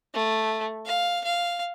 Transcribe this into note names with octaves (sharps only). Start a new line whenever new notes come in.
A3
F5
F5